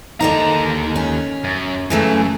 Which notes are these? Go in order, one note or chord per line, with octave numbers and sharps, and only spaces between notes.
D#2 D3 A#3 D#4 A#5
C#4
F#2
F#2 C#3 E3 A3